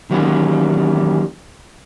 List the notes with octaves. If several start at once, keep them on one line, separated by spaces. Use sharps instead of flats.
D#3 E3 F#3 G3 A#3 C#4